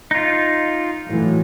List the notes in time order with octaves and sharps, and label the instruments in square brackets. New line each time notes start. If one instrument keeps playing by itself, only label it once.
[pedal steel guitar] D#4 F4
[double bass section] A2 E3 F#3